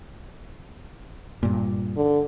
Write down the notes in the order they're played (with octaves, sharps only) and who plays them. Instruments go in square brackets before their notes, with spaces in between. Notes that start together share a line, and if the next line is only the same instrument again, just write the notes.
[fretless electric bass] G2 A#2
[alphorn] D3